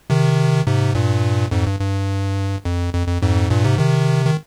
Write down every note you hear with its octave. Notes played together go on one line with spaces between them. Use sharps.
C3 D#3
G#2 C3
G2 A#2
F2 G#2
G2
G2
F2
F2
F2
F2 G#2
G2 A#2
G#2 C3
C3 D#3
D#3